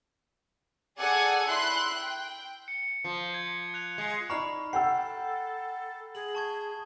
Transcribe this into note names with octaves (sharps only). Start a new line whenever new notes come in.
G#4 A4 D5 F#5 G#5
E4 C6 F#6
G5
C#7
F3
G#6 C#7
F#6 G#6 F7
G#3
D#4 D5 A#5 B5 C#6 F6
A4 F#5 G5 E6 C7
G#4 F#7
A5 C#6 G#6